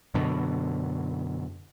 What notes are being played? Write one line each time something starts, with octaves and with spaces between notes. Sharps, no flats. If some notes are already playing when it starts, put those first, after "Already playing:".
F#2 B2 D3